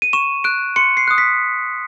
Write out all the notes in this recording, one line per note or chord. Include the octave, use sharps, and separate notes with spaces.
D#7
C#6 E7
F#6 D7
C6 C#7
C7
D#6 F#6
B6